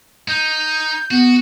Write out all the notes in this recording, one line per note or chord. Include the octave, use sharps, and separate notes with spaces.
D#4 G6
B3 F#4